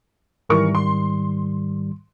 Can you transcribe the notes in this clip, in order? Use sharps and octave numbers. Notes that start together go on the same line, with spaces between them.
G#2 D#3 E3 G3 A#4 C#6
C6